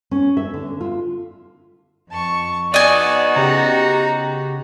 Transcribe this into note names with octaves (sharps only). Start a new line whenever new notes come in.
C#4
E5
D3
F4
F2 A5 C#6
B3 D#4 F#4 D5 D#5 G#5
C#3 G4 A#5